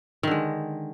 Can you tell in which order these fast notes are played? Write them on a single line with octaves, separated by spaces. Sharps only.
D#3 D3 G#3